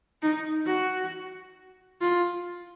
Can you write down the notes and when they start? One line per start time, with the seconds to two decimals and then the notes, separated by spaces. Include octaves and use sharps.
0.23 D#4
0.66 F#4
2.01 F4